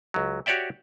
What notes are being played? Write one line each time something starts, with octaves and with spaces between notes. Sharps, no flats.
C#2 F#3
F#4 G4 C#5 D5 E5 G5